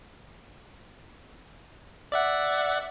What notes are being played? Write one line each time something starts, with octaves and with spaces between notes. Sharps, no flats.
D5 E5 F#5